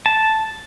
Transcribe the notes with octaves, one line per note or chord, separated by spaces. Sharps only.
A5